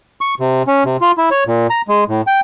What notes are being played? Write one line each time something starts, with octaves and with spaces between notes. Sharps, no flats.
C#6
C3
C#4
C3
F4
E4
C#5
A#2
A#5
G#3
A2
G5